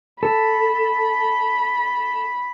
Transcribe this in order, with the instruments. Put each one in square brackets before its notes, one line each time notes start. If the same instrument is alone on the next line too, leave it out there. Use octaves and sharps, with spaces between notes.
[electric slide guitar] A4 [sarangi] B5